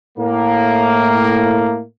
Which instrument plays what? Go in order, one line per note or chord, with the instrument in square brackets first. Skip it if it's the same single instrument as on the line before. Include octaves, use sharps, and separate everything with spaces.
[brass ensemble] A2 A#3